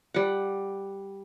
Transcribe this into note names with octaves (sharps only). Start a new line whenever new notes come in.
G3 F#5